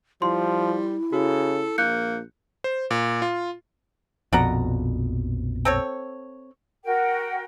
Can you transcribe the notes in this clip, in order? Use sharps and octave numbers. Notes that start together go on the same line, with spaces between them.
F3 G3 E4 C6
C#3 F#4 A4
A#1 A#3 F#6 G6 C#7
C5
A#2
F4
A#1 F2 B2 D5 F#5 A#5
C4 A4 C#5
F#4 A#4 G5